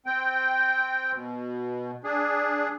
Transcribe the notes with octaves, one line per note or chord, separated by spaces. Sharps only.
C4 G5
B2
D4 G#4